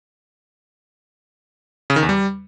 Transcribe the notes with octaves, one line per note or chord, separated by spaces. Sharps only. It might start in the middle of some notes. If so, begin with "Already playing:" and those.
C#3
D#3
E2
G3